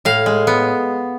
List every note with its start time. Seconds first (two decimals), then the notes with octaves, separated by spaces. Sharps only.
0.05 A2 F5
0.26 G#3
0.47 B3